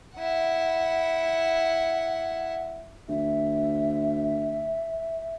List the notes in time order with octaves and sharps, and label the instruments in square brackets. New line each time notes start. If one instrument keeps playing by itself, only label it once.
[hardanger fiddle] E4 F#5
[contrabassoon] D2 [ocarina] E5